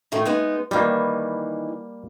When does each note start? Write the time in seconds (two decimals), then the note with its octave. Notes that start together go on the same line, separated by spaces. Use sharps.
0.12 A2 D#3 A3
0.25 G#3 B3 D#4
0.71 D#3 E3 G3 A#3